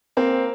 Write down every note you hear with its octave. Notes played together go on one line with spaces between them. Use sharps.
A#3 C4